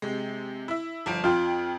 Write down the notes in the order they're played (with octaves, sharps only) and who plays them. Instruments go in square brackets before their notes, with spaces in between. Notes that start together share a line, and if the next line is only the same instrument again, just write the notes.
[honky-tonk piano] C3 G#3
E4 E5
G1 F3 D7
[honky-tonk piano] F2 G5 [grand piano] F4